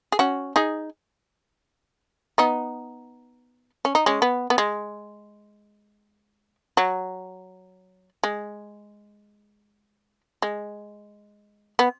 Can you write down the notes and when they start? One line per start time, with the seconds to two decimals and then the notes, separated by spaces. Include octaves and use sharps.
0.12 G#4
0.19 C#4 F#4
0.56 D#4 G#4
2.38 B3 D#4
3.85 C#4
3.95 D#4
4.06 G#3 C#4
4.22 B3
4.50 B3
4.58 G#3
6.77 F#3
8.23 G#3
10.42 G#3
11.79 B3